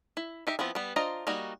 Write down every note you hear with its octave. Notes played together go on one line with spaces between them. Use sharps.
E4
D#4 G4 E5
F3 B3 C4 E4
G3 B3
D4 F4 C5 D#5 A#5
G3 A#3 D#4 F#4